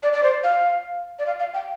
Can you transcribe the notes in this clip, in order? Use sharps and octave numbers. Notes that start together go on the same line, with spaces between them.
D5
D5
C5
F5
D5
F5
F5
G5